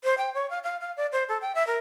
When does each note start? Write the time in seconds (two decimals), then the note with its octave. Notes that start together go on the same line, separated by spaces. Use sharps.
0.04 C5
0.18 G5
0.34 C#5
0.50 F5
0.63 F5
0.81 F5
0.97 D5
1.12 C5
1.29 A4
1.41 G5
1.55 E5
1.67 A#4